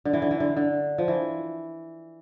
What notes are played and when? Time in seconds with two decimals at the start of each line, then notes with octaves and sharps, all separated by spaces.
0.05 D3
0.13 E3
0.22 D3
0.31 E3
0.40 D3
0.57 D3
0.98 F3
1.08 E3